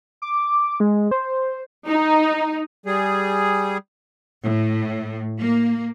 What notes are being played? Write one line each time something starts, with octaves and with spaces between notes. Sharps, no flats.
D6
G#3
C5
D#4
G3 G#4
A2
A#3